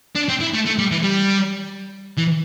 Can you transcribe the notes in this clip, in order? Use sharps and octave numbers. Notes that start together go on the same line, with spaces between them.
D4
C4
E4
A3
A3
G3
E3
G3
E3